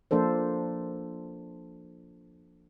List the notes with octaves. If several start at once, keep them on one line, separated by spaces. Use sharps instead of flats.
F3 A#3 D4 A4 C5